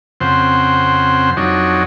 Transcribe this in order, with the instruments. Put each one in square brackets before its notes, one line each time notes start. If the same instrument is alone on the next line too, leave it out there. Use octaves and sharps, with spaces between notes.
[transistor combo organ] F2 C#3 C4 C5 F#5
F2 F#3 D4 D#4 C#5